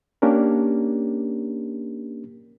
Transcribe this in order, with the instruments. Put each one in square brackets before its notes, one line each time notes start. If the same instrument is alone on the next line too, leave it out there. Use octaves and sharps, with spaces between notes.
[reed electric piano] A#3 C#4 D4 G4 A#4